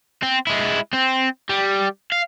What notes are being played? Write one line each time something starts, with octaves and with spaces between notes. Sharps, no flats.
C4
G#3 E4
C4
G3
F5